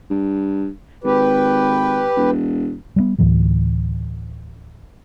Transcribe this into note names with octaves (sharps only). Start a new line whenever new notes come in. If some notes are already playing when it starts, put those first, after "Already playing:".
G2
G#1 G4 B4
E1
G3 G#3 B3
D2 A2 E3 F#3